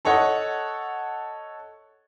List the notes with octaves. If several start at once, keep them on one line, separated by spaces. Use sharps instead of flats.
A4 C#5 D#5 F#5